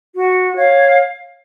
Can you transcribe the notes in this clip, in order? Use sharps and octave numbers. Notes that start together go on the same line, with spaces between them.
F#4
C#5 F5